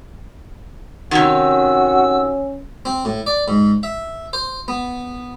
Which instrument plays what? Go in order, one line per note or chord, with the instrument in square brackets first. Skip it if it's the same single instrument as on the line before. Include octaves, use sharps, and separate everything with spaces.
[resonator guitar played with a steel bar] C3 D#3 [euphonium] C#4 [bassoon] F#4 [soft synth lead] E6
[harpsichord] C4
A2
D5
G#2
E5
C5
B3